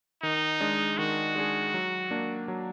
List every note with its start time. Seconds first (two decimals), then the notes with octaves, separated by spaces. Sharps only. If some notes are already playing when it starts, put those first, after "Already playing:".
0.23 D#3 D#4
0.60 G#3 D4 G#4
0.98 D#3 F#4
1.35 G#3 D4 G#4
1.74 F#3
2.11 A#3 D4
2.48 F#3